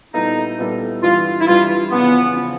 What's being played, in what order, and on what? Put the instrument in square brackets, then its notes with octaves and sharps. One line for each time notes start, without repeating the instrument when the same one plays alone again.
[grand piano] A#2 G3 B3 E4 A4 [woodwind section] D#4
[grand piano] A#2 G3 B3 E4 A4
[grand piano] G2 E3 G3 [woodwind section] F4
[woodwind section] E4
[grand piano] G2 E3 G3 [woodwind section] F4
[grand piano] E2 C#3 F3 [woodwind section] B3
[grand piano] C#3 F3